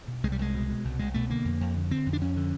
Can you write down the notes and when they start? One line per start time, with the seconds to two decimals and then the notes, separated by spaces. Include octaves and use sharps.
0.08 B2
0.23 C2 G#3
0.32 G3
0.39 C2 G#3
0.54 B2
0.69 B2
0.85 C2
0.99 C2 G#3
1.14 B2 A3
1.30 D3 A#3
1.45 F2
1.61 F2
1.75 D3
1.90 D3 C4
2.06 F2
2.13 D4
2.21 F2 C#4
2.36 D3